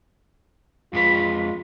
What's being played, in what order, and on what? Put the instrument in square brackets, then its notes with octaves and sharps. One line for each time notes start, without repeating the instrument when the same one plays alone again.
[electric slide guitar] F2 G#3 B4 [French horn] F4